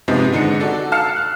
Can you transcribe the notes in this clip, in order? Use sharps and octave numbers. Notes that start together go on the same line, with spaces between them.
G#2 C3 F3 G#3 B3 C4
G#2 D3 G#3 D#4 C#7
F#4 A4 D5
F5 A5 E6 F6 C7 C#7
F#6